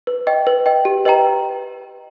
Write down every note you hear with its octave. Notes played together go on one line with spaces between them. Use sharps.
B4
D#5 G5
B4
D#5 G5
G4
B4 D#5 G5 A#5